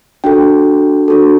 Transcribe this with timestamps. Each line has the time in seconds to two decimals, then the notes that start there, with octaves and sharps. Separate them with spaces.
0.24 D4 F#4 A4 G5
1.08 D4 F#4 A4